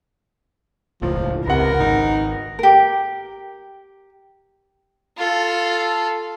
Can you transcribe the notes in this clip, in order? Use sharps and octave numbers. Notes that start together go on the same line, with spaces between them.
E1 C#2 A2 F3
C#2 C3 A#4 B4 F#5
G#1 D#4
G4 A#4
F4 A4